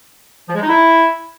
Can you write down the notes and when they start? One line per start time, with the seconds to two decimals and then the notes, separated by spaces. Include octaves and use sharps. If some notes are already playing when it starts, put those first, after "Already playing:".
0.48 F3
0.54 G#3
0.61 D#4
0.67 E4